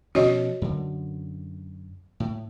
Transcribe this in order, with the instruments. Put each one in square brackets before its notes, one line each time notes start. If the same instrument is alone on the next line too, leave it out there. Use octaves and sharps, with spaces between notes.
[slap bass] B2 F3 C#4 [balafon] F#4 C#5 D#5
[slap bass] F#2 D3
A2